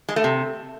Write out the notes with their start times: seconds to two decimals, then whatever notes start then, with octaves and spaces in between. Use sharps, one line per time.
0.09 G#3
0.16 A3
0.24 C3